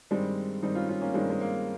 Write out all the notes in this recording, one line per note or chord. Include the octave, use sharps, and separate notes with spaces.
G2 D#3 G3 G#3 C4
G2 D#3 G3 C4 D#4
C#4 F4
C#4 F4
A#3 C#4
G2 D#3 G3 G#3 C4
G#3
A#3